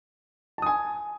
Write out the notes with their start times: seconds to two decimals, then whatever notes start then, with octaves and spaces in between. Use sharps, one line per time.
0.58 A5
0.62 D#6
0.66 G#5